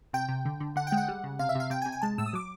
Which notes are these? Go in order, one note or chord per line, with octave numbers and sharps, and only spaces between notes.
C3 G5
C3
D3
D3
D3 F#5
G5
G#3
F#5
G3
C#3
C3 F5
E5
C3 F5
C3 G5
G#5
C3
G#5
G#3 A5
A2 E6
D#6
F#3 D6